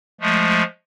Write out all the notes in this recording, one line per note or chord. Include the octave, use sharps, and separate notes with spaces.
F3 G#3 A3